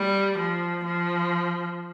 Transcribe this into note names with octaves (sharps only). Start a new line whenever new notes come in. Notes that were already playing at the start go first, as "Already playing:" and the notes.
Already playing: G3
F3
F3